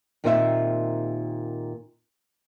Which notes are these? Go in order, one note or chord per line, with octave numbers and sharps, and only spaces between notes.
D#2 A#2 C4 D#4 C5 E5